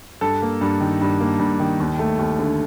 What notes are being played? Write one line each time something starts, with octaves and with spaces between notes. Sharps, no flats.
G2 A4
A#3
G2
D#3
G2
A#3
G2
D#3
D#2
A3
D#2
D3